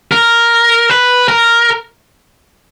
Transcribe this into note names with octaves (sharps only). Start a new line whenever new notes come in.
A#4
B4
A#4